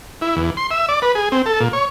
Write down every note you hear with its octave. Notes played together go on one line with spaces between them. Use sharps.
E4
E2
C6
E5
D5
B4
G#4
C4
A4
A#2
C#5